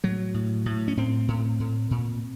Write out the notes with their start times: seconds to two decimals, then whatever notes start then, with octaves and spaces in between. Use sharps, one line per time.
0.04 A2 F#3
0.34 A2
0.66 A2
0.88 C#4
0.97 A2 C4
1.28 A2
1.60 A2
1.91 A#2